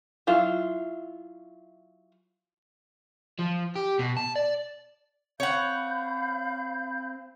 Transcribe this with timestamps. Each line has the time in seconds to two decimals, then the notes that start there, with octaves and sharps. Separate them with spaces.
0.27 F#3 E4 F4
3.39 F3
3.76 G4
3.99 B2
4.17 A5
4.36 D5
5.40 C4 C#5 F5 F#5 B5 G6